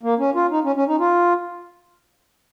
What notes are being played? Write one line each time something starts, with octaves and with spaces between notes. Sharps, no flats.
A#3
C#4
F4
D#4
C#4
C#4
D#4
F4